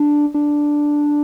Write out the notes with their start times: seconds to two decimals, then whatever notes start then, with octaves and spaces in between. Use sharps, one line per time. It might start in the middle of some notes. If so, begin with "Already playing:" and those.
Already playing: D4
0.34 D4